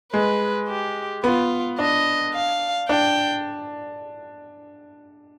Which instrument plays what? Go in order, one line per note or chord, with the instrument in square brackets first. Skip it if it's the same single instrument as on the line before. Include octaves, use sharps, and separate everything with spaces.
[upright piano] G#3 [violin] B4
[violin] G4
[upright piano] B3 [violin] F4
[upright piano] D4 [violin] D#5
[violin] F5
[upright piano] D4 [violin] G5